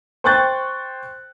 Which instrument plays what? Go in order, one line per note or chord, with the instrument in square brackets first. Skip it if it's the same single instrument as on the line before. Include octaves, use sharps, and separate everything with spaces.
[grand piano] C5 G5 C#6 F#6 G6 A6